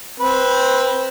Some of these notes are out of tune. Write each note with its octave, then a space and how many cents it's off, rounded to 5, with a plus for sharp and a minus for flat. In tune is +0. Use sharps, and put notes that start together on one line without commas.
C4 +5 B4 -10